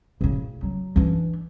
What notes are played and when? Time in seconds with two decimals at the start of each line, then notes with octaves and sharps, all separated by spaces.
0.21 A2 C#3
0.63 F#3
0.96 E3 D4